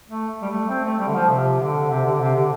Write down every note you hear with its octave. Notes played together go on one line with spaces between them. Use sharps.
A3
G3
A3
C4
A3
G3
D3
F3
C3
D3
C3
D3
C3
D3